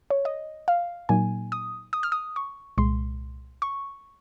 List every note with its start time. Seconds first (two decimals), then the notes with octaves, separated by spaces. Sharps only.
0.10 C#5
0.25 D#5
0.68 F5
1.09 A#2 F#3 A#3 D#4 G#5
1.52 D#6
1.93 D#6
2.03 F6
2.12 D#6
2.36 C#6
2.78 C2 A#2 G#3 C6
3.62 C#6